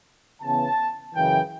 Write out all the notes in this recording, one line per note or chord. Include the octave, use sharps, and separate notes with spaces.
C#3 E3 B3 A5
F#2 C#3 E3 G5